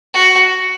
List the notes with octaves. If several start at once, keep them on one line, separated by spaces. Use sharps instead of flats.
F#4